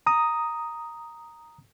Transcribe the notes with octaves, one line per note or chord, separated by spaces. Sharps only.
A#5 D#6